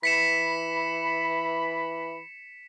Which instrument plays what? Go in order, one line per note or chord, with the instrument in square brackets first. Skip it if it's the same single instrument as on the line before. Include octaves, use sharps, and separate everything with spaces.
[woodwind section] E3 B5 [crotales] B6 C#7 E7